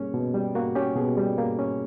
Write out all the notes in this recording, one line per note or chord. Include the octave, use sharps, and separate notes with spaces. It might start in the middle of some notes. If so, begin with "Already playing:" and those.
Already playing: B2 G3 A#3 C#4 G#4
B2
G3
A#3 F#4
C#4 G4
B2 G#4
G3
A#3
C#4